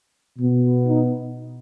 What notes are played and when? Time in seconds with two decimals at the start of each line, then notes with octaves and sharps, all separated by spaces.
0.38 B2 B3
0.86 D#4